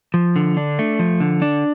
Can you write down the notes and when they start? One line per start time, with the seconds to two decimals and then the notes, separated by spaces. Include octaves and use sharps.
0.14 F3
0.36 D3
0.57 D4
0.79 A3
0.99 F3
1.20 D3
1.42 D4